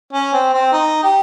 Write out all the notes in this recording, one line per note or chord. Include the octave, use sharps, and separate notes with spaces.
C#4
C4
C4
D#4
G4